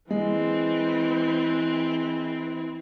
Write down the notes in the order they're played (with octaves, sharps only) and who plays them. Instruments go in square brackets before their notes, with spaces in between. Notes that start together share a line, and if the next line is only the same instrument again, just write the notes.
[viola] E3 C4 [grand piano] G#3